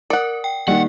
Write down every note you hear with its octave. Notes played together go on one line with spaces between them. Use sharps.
A#4 D5 F#5
G5
D#3 G3 A#3 F#5 G5